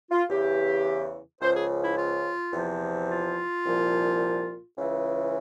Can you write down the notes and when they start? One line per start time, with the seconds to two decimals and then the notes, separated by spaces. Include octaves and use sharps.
0.11 F4
0.30 E2 C#3 E3 G4
1.41 C#2 C#3 F3 C5
1.55 G#4
1.84 E4
1.98 F4
2.53 E2 C3 F3
3.10 F4
3.65 C2 A#2 F3
4.78 C#2 C#3 E3